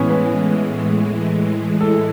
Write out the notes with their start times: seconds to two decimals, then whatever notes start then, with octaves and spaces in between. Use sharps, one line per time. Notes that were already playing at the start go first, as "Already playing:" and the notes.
Already playing: A2 E3 G#3 B3 C#4
0.10 B4
1.81 A4